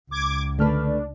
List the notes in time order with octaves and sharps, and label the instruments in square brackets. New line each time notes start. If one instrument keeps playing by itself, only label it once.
[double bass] C#2 [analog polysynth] D6 G#6
[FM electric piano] D3 F6 [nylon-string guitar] A3 B4 [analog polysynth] D4